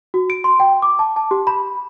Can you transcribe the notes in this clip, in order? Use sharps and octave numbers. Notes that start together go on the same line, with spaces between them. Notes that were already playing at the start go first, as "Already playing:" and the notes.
F#4
D7
C6
G5
D6
A5
A5
G4
B5